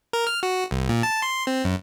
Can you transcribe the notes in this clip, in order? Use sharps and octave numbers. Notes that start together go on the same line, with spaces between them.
A#4
F6
F#4
C2
A#2
A5
C6
C4
F#2